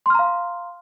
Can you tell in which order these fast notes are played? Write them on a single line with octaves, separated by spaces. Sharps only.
C6 F6 A#5 F5